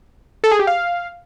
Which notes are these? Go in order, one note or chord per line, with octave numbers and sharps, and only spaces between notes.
A4
G#4
G4
F5